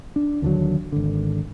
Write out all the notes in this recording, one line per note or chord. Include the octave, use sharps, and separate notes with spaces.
D4
D#2 D3 F#3
G#1 D3